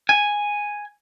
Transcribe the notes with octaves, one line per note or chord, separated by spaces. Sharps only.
G#5